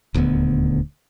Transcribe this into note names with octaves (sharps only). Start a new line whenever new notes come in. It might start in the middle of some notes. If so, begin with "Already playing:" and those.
D#1 D2 D3 B3